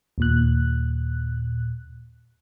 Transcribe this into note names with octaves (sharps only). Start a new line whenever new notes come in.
D#2 A#2 F#6